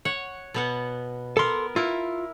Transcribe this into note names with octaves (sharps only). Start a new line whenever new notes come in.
C#5 F#5
B2 B3 F#5
B3 A4 A#4 C6
E4 F4 A#4